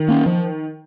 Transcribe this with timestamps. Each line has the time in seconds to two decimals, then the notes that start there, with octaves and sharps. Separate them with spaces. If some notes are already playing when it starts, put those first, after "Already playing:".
Already playing: D#3
0.08 A#3 C#4
0.26 F3